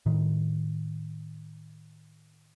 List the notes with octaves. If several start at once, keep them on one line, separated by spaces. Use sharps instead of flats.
A2 D#3